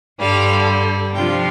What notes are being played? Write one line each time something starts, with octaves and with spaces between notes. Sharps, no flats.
G2 D3 G3 F5
C3 F3 D4 F4 G5